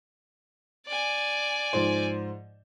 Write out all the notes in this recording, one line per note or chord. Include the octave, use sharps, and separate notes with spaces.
D5 G#5
G#2 F3 C5